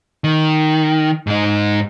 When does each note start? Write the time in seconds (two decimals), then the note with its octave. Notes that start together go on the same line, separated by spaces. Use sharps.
0.24 D#3
1.27 G#2 D#4